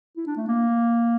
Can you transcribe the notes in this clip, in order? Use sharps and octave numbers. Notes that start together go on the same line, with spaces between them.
E4
D4
A3
A#3